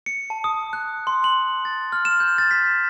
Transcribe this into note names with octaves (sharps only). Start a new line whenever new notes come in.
C#7
A5
D#6
F#6
C6
F#7
A6
F6
E7
G6
A6
B6